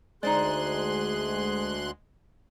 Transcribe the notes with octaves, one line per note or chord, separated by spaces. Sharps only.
D2 G#3 D#4 G#4 C5 D5 C6 F#6